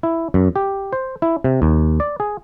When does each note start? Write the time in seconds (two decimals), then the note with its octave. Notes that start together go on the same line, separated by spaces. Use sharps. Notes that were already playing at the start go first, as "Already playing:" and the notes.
0.03 E4
0.34 F#2
0.56 G4
0.93 C5
1.22 E4
1.44 C3
1.62 D#2
2.00 D5
2.20 G#4